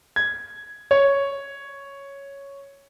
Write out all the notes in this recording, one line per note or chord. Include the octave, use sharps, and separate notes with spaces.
G#6
C#5